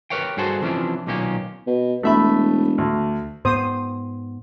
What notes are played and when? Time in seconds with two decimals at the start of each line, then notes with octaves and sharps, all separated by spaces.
0.10 G4 A#4 B4 C#5 F5 G5
0.37 G2 F#4 G#4 A4 C5
0.61 C3 E3 F3 G3 C#4 D4
1.07 B1 A#2 D#3 A#3 C#4 G4
1.67 B2
2.03 E1 A3 E5 B5
2.78 D2
3.45 G#2 B3 C5 D#6